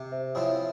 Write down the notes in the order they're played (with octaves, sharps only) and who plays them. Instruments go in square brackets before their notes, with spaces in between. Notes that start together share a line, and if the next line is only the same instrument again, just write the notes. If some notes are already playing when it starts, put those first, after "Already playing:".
Already playing: [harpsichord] C3
[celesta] C5 E5
[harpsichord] F3 C4 E4 G#4 [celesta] C#5